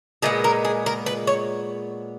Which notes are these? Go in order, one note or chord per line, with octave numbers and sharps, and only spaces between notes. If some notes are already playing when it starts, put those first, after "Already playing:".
A#2 G#3 B3 G#4
A#4
G#4
A#4
B4
C#5